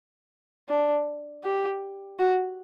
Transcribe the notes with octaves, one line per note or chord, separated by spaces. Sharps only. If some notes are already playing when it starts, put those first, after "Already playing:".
D4
G4
F#4